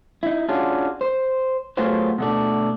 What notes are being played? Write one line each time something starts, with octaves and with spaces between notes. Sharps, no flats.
D#4 E4
C#4 D4 F4 F#4 G#4
C5
F#3 A3 B3 F4 G#4 C5
B2 A3 D4